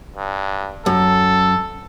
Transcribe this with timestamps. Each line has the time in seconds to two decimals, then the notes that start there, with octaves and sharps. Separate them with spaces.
0.16 G2
0.86 F#2 A4